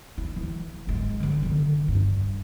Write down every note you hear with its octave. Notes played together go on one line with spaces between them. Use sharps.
E4
E3
G#1 G#3
D3 D#3
D3 D#3
G2